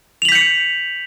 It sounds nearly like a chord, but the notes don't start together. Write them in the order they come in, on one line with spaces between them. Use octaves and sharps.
F7 F#7 B6 G6 C#7